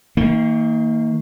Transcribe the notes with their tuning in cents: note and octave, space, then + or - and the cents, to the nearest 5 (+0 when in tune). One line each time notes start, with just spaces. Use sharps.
D#3 +30 A#3 -20